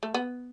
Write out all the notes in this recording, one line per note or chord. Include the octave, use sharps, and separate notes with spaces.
A3
B3